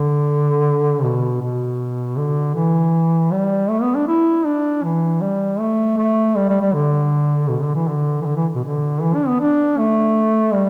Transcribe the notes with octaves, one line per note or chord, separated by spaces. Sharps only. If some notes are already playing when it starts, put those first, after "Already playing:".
Already playing: D3
B2
B2
D3
E3
G3
A3
B3
D4
E4
D4
E3
G3
A3
A3
G3
G3
G3
D3
B2
D3
E3
D3
E3
D3
E3
B2
D3
E3
D4
B3
D4
A3
G3